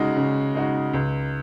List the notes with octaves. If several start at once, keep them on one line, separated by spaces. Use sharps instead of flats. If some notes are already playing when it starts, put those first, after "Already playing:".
Already playing: C#3 G#3 D#4 F#4
C#3
G#3 D#4 F#4
C#2